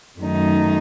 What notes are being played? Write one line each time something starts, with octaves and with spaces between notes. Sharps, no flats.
F#2 D#3 A3 D#4